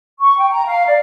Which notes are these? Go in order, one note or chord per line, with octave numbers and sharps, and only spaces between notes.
C#6
G5
A#5
F5
D5